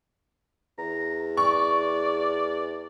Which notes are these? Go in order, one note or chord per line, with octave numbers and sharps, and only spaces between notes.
E2 A#5
D5 C#6